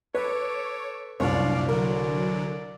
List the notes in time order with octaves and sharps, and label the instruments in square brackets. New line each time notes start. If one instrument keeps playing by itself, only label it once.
[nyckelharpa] A4 D6 [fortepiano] B4 [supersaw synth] C#5
[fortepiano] C2 [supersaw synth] F#2 A#2 D4 [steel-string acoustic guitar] C#5 [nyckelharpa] D5 F5
[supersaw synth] D3 F#3 [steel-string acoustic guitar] A#4 [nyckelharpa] D5